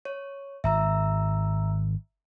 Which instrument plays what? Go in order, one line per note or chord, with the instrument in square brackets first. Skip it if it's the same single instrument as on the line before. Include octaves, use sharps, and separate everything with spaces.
[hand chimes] C#5
[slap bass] G#1 [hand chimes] E5 A#5 E6